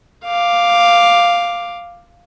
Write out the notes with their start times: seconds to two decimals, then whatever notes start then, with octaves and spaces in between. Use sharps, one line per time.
0.25 F5 D6